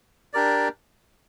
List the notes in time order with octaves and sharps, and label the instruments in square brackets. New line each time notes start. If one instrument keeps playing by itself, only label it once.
[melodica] D4 G4 A#4 D5